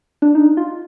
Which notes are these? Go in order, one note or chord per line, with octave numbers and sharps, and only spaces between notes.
D4
D#4
F4